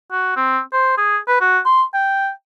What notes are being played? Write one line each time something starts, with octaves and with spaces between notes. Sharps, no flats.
F#4
C4
C5
G#4
B4
F#4
C6
G5